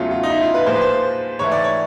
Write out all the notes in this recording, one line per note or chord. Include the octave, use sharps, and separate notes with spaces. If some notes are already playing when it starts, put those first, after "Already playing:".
Already playing: E2 C#3 F#3 A3 F4
F4
D#4
E4
F4
B4
A#2 F3 G#3 C5
B4
C5
G#2 E3 A3 C#5
D5
C#5